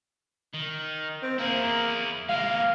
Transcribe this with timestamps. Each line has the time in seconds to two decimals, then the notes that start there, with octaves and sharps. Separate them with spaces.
0.54 D#3
1.22 C4
1.39 A#3 E4 G#4
2.29 G#3 A#3 F5